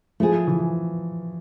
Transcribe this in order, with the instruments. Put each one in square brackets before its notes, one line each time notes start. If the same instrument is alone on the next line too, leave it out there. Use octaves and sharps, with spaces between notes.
[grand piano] F3 [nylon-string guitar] A3 E4 G#4
[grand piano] E3